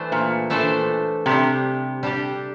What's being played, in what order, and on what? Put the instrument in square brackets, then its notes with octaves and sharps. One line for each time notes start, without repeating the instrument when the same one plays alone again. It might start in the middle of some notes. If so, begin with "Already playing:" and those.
Already playing: [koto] E3 A3 D4 A4 C5
[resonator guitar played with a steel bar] A#2
[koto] E3 A3 D4 A4 C5
[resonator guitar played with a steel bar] C3 [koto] G3 D4 G4
[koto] G3 D4 G4